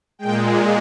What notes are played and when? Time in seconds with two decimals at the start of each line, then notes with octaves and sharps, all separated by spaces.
0.19 A#2 G#3 G5